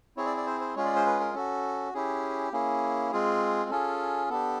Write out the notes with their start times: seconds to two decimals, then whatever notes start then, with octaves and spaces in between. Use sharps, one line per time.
0.17 C4 E4 G#4 C#5
0.26 D5
0.37 D5
0.46 C5
0.61 C5
0.75 G#3 C#4 F4 G#4 C#5
0.85 D5
0.96 C5
1.06 B4
1.20 A#4
1.34 C#4 F#4 A4
1.94 C#4 E4 G4 G#4
2.53 A#3 C#4 E4 G#4
3.12 G#3 C4 F4 G#4
3.70 C#4 F4 G#4 A4
4.30 B3 D4 G4 A4